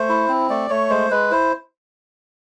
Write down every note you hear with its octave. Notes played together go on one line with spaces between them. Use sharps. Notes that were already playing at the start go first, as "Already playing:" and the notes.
Already playing: A3 C5
E4
C4
A3 D5
A3 C#5
G#3 C5
G#3 B4
E4 C5